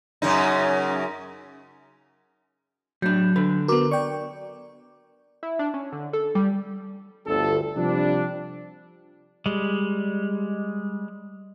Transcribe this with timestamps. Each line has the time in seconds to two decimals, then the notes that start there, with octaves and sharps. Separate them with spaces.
0.22 F#2 C#3 D#4
3.02 A2 F#3 D4 G6
3.36 D3 B4
3.68 B3 F#4 A#4 D6
3.91 D5 G5 C#6
5.43 E4
5.59 D4
5.74 C#4
5.93 D3
6.13 A4
6.35 G3
7.27 G1 D2 A4
7.76 C3 F3 G3 D4
9.46 G3 G#3